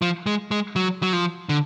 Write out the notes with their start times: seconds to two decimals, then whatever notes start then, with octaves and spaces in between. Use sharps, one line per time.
0.02 F3
0.26 G#3
0.51 G#3
0.76 F#3
1.03 F#3
1.13 F3
1.49 D3